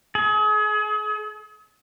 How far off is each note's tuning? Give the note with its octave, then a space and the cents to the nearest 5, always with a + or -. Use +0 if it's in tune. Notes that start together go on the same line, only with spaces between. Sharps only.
G#4 +35